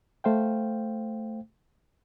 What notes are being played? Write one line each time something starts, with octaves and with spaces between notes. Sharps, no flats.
A3 C5 F5 G5